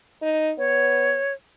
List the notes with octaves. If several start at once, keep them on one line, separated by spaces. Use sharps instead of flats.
D#4
B3 C#5